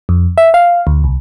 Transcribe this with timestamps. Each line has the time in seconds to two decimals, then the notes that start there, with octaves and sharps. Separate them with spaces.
0.09 F2
0.38 E5
0.54 F5
0.87 D2
1.04 C2